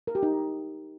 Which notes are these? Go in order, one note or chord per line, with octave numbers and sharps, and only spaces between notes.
A#4
G4
D#4